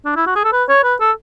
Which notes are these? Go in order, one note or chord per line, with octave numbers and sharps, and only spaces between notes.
D4
E4
F#4
G#4
A4
B4
C#5
B4
A4